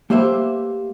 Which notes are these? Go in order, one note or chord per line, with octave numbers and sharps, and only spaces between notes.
A3 A#3 G4 B4 C5 E5